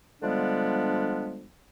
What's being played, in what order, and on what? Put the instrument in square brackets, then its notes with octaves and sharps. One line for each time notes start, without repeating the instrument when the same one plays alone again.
[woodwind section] D3 F3 G3 G#3 B3 D4